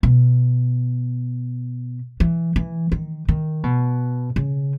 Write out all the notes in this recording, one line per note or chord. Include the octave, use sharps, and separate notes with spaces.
B2
E3
E3
D#3
D#3
B2
C#3